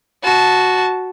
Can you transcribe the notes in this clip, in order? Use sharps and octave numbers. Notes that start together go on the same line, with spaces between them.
F#4 A5